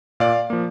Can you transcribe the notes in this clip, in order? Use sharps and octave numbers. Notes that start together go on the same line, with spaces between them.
A#2 D5 F5
F3 A#3